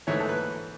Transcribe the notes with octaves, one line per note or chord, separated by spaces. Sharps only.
G#2 E3 A3 C#5
A4
B4